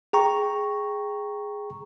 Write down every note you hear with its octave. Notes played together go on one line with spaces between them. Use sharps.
G#4 G5 A#5 C#6